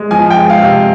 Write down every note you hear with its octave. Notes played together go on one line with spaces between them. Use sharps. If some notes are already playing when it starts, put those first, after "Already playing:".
Already playing: G#3
F3 G#5
G5
G#3
F5
C3